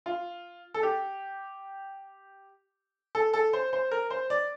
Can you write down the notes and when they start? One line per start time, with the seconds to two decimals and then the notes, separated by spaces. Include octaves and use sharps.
0.06 F4
0.74 A4
0.83 G4
3.15 A4
3.33 A4
3.53 C5
3.73 C5
3.91 A#4
4.10 C5
4.30 D5